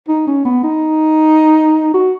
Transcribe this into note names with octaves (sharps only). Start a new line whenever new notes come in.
D#4
C#4
B3
D#4
F#4